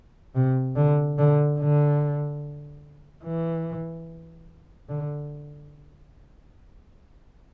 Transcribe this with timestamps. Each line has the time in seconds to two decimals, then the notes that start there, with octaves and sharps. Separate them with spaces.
0.35 C3
0.76 D3
1.18 D3
1.60 D3
3.24 E3
4.89 D3